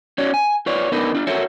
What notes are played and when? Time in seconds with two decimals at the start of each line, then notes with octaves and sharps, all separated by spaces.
0.18 C#4 F#4 C#5 D5
0.34 G#5
0.66 F4 B4 C#5 D5
0.92 D3 B3 D4 D#4 A#4 B4
1.15 D4 F4
1.27 F#4 A4 A#4 C#5 E5